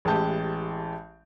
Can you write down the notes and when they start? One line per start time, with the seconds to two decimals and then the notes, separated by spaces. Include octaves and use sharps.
0.05 A1 E3 G#3 G4 A5 G6